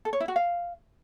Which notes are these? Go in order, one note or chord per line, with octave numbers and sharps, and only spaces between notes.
A4
C#5
E4
F#4
F5